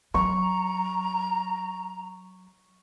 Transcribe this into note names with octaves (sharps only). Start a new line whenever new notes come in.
F#3 A#5 C#6